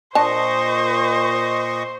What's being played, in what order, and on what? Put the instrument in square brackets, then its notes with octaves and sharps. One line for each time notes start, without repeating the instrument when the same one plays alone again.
[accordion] A#2 D#5 C#6 [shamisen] D4 A5 [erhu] C5